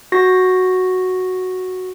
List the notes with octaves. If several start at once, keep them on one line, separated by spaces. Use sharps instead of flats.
F#4 A#6